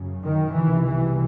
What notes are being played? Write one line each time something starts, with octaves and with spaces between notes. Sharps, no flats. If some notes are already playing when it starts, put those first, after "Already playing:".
Already playing: F#2 C#3
D#3
C2 B2 E3
E3